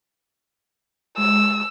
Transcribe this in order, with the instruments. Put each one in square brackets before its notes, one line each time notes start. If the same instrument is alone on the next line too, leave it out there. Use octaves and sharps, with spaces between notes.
[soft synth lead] G#3 [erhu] E6